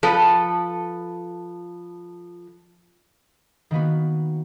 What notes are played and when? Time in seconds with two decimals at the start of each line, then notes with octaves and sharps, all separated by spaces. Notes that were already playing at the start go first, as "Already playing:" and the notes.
0.03 F3 A4 B4
3.71 D#3 A#3 B3 F#4